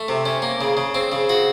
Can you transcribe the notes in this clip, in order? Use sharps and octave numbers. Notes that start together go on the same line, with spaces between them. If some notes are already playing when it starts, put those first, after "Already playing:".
Already playing: A3
C3
C#4
A#3
C#3
C#3
C4
C#3
F#4